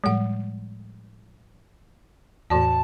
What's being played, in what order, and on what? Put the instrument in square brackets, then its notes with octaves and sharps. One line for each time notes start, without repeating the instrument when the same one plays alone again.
[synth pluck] A2 G3 G#3 [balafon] F3 F#5
[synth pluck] E2 A2 [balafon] E3 F#4 D5 [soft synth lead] A5